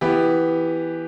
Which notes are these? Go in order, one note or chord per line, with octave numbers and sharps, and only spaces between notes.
E3 B3 G4